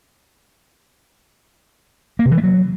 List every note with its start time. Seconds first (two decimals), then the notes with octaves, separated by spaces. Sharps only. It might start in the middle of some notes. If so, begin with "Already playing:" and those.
2.19 A#3
2.25 C3
2.31 E3
2.37 A3
2.44 F#3